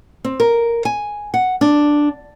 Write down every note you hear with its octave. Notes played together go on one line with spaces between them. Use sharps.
C4
A#4
G#5
F#5
D4